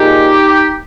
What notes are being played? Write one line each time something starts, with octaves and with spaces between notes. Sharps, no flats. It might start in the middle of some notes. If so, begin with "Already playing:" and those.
Already playing: A#2 G#3 D#4 G4